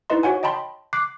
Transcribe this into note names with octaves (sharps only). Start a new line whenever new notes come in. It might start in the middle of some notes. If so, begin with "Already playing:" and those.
D#4 E4 B4 D#5 C6
F#4 C#5 F#5 G#5
D#5 G5 A5 B5 C6
D6 F#6 C7